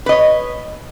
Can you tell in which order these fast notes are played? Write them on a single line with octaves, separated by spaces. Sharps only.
B4 D#5 C#5